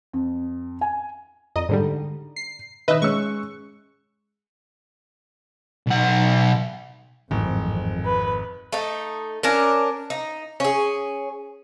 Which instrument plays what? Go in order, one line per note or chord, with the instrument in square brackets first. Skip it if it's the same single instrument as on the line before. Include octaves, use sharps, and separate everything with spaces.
[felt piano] F2
G#5
[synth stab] F2 D#5 [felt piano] D5 A#5
[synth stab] G#2 D3 G3
C7
[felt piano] D#3 F#6 [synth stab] B4 D#5 E5
[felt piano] G#3 C#4 E6 [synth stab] C#6
[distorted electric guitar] B1 F#5
[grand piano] G#1 [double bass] F2 [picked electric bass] A2 E3 F#3
[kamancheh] B4
[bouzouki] A3 D#4
C#4 D4 A#4
D#4
C#4 G#4